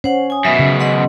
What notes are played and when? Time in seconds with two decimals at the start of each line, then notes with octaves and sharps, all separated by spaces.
0.04 C#4 C5 F#5
0.30 G#5 D#6
0.45 F#2 B2 E5
0.59 C#3
0.80 D#5 F#5 C6